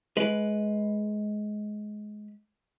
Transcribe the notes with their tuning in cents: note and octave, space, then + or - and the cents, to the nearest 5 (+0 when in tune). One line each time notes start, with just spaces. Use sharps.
G#3 +20 B4 +0